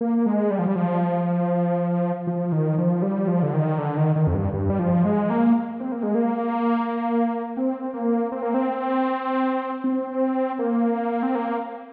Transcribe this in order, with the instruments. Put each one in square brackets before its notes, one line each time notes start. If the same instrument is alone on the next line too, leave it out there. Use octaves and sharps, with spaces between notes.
[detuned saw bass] A#3
G#3
G3
F3
G3
F3
F3
D#3
F3
G3
F3
D3
D#3
D3
D#3
D#3
F2
G2
G2
G3
F3
G#3
A#3
C4
A#3
G#3
A#3
C4
A#3
C4
A#3
C4
C4
A#3
C4
A#3